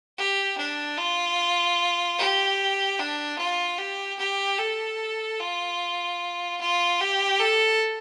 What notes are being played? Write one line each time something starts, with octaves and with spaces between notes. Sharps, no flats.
G4
D4
F4
G4
D4
F4
G4
G4
A4
F4
F4
G4
A4